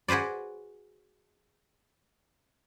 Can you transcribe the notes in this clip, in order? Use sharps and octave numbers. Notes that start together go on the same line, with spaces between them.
F#4 G#4 B4 C5 D5